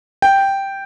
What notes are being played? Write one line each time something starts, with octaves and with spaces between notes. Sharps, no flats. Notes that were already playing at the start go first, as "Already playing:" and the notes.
G5